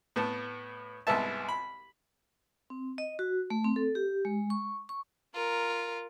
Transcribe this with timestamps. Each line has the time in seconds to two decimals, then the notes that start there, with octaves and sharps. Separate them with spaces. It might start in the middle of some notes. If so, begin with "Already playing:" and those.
0.16 A2 B3 A5
1.07 C2 G#2 B3 E5 A5
1.49 B5
2.70 C4
2.98 D#5
3.19 F#4
3.50 A3
3.64 C4
3.76 A4
3.95 G4
4.25 G#3
4.50 C#6
4.89 C#6
5.35 F4 A#4